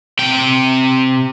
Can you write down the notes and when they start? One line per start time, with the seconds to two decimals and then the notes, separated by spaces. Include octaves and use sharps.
0.19 C3 G5